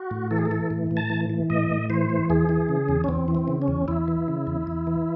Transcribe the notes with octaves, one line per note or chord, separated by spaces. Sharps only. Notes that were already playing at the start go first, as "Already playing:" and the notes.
Already playing: F#4
A2
E3 A4
G#4
A4
E3
A2
A2
A5
E3
E3
A2 D#5
A2
E3 C5
E3
E2 G#4
E3
C#3
E2
C#4
E2 C4
E3
C4
C#3
C#4
E2
E2 E4
E3
C#3
E2
E2
E3